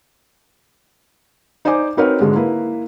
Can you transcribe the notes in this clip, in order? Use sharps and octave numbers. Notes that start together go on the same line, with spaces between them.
D#4 C5 D5 G#5 D6
C4 D#4 F#4 A#4 B4 C#5
G#2 D3 G#3 F#4
A#3 E4 B4